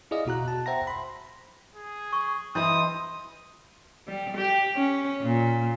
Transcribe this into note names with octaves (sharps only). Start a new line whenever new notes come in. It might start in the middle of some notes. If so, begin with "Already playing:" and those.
E4 G#4 D5 D#5 F5
B2 F#4 A#5 F#6
A5
C5 E5 F#5 G5 A#5 A#6
B5 C6
G#4
C#6
E3 D4 E4 B4 C5 D#5 C6 D#6
G3
G4
C#4
A#2